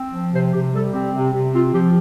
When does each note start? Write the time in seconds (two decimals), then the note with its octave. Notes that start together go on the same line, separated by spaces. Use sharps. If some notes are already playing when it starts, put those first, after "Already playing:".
Already playing: C4
0.12 F3
0.32 C3 C5
0.52 C3 G4
0.72 G3 A4
0.92 C4 G4
1.13 C3
1.33 C3
1.54 C4 F4
1.73 F3 G4